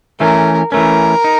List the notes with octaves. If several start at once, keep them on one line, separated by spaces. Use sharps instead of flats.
E3 A3 C#4 A#4
E3 A3 C#4 A#4
D#4